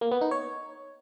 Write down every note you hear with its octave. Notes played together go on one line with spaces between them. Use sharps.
A#3
B3
D#4
C#5